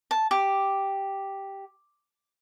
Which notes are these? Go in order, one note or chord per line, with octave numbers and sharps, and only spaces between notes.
A5
G4